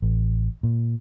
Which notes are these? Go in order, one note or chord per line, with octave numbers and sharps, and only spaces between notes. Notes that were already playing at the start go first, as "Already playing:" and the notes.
A1
A#2